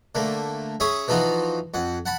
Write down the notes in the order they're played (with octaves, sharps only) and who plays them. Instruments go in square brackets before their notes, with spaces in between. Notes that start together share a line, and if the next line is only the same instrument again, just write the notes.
[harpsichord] D3 A3 A#3
C#4 G#4 E5 C#6 D#6
E3 F3 D#4 F4 F#4
F2 F#5
F#5 A5 B5